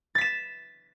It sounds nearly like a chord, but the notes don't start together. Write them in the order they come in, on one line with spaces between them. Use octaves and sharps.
A6 B6 E7